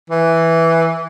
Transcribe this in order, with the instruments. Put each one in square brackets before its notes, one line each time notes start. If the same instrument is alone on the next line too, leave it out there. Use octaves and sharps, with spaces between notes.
[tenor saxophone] E3